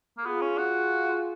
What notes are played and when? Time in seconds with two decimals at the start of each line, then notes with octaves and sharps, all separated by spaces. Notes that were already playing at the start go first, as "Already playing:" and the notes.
0.18 A#3
0.25 B3 F4 G#4
0.41 C#4
0.58 F#4